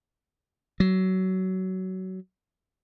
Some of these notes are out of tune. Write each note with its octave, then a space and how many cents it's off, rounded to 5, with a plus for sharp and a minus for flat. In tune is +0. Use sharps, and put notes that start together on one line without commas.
F#3 +20